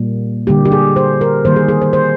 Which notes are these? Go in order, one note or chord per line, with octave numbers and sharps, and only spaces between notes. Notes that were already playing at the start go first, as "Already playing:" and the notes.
Already playing: A#2 G3 A#3
D3 G3 A#3 G4
G4
G#4
C5
A#4
D#3 G3 A#3 C5
G#4
G#4
C5
C5